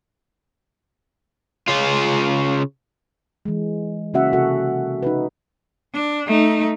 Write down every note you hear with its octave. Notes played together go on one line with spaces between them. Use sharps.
C#3 F4
E3 G#3
C#3 A#3 C#4 F#4 E5 F#5
C3 F#4 A4 F#5
D#4 F#4 B4
D4
A3 D#4